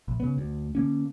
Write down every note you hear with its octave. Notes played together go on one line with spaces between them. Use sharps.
A#1
C#3 B3
D2
D3 A#3 C#4